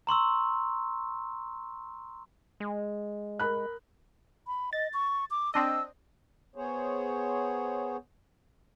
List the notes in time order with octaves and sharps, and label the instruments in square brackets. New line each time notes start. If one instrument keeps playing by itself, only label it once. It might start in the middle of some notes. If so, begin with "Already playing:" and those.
[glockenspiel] A#5 C6 C#6 E6
[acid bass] G#3
[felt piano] A#4 B5 F#6
[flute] B5
[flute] D#5 [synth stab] A6
[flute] C#6
D6
[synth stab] C4 D4 D#5 [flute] E6
[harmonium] B3 G#4 C5 C#5